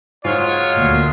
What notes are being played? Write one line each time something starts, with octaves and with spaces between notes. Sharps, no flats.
G#2 F#3 G#3 F4 C#5
D2 A#2